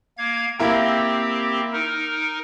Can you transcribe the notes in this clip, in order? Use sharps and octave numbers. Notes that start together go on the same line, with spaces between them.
A#3 F5 G#6
A#3 C4 E4 G4 A#4
D#4 A#4